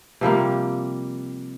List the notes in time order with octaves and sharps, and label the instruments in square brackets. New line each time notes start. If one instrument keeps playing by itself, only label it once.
[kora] C3 F3 G3 A#3